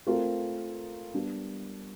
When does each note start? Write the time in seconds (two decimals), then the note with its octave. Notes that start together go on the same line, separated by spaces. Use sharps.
0.07 A3 C4 F4 A#4
1.14 G3 B3 D4